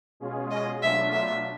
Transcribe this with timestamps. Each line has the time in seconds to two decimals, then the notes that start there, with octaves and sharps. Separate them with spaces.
0.20 B2 G#3 C#4 F4 G#4
0.51 D#5
0.82 B2 F#3 A3 D4 F4 E5
1.12 E5